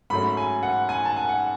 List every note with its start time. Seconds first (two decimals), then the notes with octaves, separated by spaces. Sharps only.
0.10 G#2 F#3 A3 C#4 B5
0.37 G#5
0.63 F#5
0.89 G#5
1.05 A5
1.16 G#5
1.29 F#5